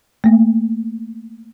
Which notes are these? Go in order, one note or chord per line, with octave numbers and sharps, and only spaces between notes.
A3 A#3